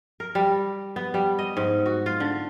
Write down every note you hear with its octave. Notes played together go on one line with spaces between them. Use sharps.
A#4
G3
B3
G3
D#5
G#2
F#4
F4
D3